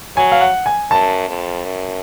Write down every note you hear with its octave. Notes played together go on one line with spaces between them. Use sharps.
F#3 G#5
F5
F#5
G#5
F#2 A5
F2
F#2